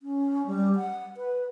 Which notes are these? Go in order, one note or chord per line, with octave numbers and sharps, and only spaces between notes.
C#4
G3
F#5
B4